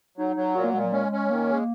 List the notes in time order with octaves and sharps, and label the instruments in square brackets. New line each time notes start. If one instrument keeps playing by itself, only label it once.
[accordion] F#3 [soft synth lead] D#4
[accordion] F#3
[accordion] A#2 [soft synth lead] F#4
[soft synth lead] A#3
[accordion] A#2 [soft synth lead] G#3
[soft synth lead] F#3
[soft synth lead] G#3 [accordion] C#4
[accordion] C#4
[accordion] D#3 [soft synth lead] A#3
[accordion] G#3